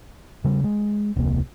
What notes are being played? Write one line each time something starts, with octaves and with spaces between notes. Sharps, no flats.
C#3 G3
G#3
E1 C#2 C3 A#3